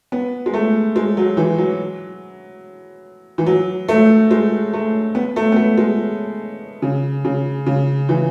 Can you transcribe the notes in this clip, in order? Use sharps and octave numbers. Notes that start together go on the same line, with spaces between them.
B3
G#3
A3
G#3
F#3
E3
F#3
E3
F#3
A3
G#3
A3
B3
A3
B3
A3
G#3
C#3
C#3
C#3
E3